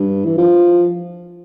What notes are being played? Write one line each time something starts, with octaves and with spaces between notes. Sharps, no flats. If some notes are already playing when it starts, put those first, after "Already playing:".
Already playing: G2
E3
F3